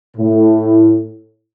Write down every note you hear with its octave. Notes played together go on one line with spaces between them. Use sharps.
A2